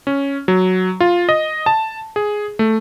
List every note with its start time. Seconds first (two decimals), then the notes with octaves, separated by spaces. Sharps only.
0.07 C#4
0.48 F#3
1.00 F4
1.29 D#5
1.66 A5
2.16 G#4
2.59 A3